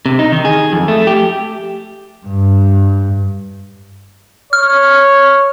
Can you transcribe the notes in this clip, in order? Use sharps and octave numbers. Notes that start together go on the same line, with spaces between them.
C3
D#4
D#3
G#4
F2
A3
G4
G2
C#5 F6